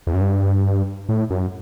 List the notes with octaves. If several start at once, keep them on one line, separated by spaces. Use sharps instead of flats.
E2
F#2
G2
A2
F#2